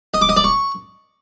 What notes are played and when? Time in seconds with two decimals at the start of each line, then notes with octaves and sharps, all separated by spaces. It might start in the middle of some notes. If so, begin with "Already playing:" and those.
0.14 D#5
0.21 D6
0.29 D#5
0.37 D5
0.44 C#6